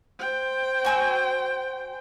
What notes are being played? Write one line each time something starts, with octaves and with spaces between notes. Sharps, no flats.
C5 G5
F#4 G#5 E6